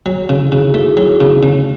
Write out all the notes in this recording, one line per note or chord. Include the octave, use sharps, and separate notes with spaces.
F#3
C#3 E4 G#4
C#3 D#4 F#4
A3 E4 G#4
F#3 E4 G#4
C#3 B3
C#3 A3